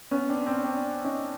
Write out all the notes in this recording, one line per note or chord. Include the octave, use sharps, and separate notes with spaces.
B3 C#4
C4 D4
C4 D4
C4 D4
C#4 D#4